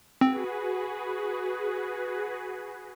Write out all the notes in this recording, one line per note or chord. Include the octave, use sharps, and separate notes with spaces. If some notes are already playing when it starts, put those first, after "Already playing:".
C4 F#4 G#4 B4